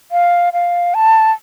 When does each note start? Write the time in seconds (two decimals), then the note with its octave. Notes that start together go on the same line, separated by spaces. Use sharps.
0.12 F5
0.53 F5
0.94 A5